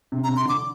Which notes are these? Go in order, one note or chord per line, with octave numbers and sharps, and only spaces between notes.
C3
A#5
C3
C6
D3
D6